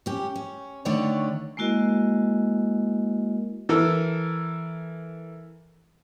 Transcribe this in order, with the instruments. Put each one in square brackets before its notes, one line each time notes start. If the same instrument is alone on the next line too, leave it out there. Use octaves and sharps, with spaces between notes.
[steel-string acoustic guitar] C#4 G4
C#4
D3 D#3 A3 C#5 D5 A#5
[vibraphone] G#3 A#3 E4 F#4 A#4 D#5
[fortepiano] E3 A4 A#4 E6